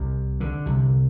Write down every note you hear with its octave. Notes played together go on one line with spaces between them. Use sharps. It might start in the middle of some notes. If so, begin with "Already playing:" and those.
Already playing: C2 C3
D3
C2 C3